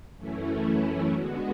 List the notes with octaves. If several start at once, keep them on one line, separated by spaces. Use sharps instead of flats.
F#2 E3 A3 C#4 E4
D3 G#3 B3 F#4